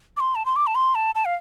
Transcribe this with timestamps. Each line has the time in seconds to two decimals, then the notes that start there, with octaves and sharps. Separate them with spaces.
0.17 D6
0.20 C6
0.35 A5
0.46 C6
0.56 D6
0.67 A5
0.75 C6
0.95 A5
1.15 A5
1.25 F5